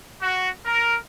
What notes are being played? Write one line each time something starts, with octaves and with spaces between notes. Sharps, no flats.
F#4
A#4